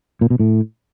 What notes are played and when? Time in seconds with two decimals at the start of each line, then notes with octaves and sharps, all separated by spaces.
0.21 A#2
0.30 B2
0.40 A2